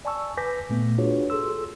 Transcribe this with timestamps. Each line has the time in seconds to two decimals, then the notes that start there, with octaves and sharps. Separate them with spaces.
0.05 D5 G#5 A5 C#6 E6
0.37 B4 G#5 D6 G6 A#6 B6
0.70 A#2 A3 B3
0.98 D4 F4 F#4 G#4 B4 C#5
1.30 G#4 A4 C6 E6